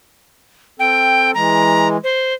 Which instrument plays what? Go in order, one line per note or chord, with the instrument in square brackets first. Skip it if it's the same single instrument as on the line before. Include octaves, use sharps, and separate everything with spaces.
[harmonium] C4 A4 [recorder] G5
[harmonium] E3 G#3 [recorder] A#5
[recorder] C5